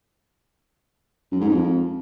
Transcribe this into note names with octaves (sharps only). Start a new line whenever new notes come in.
F#2
G#2
F2